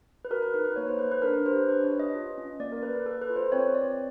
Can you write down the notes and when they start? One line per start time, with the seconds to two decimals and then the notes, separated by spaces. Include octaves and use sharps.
0.25 B4
0.30 F#4 A#4
0.43 B4
0.54 D#4 B4
0.65 B4
0.76 A#3 C#5
0.88 C5
0.99 A4 B4
1.12 B4
1.22 D4 A#4
1.34 B4
1.46 G4 C5
1.57 B4
1.68 D4 B4
1.84 C#5
1.91 G4
1.99 D#5
2.15 F4
2.38 C#4
2.60 A#3 D5
2.72 A#4
2.83 A#3 B4
2.95 B4
3.06 A4 B4
3.22 B4
3.30 F4
3.36 C5
3.52 C4 C#5
3.75 C4 D5